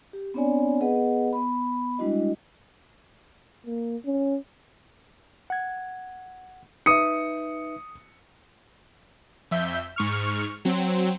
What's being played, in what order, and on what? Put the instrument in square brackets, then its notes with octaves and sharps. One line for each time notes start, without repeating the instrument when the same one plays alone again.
[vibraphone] G4
B3 C4 D4 C#5 D5 G#5
B3 G#4 B4 D#5 F#5
B3 B5
G3 G#3 D4 E4 F#4 D#5
[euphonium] A#3
C#4
[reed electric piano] F#5 G#6
[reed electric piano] D#4 B4 E5 [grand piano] D#6 C#7
[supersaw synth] F2 E5 G6
G#2 C#6 F6
F#3 C4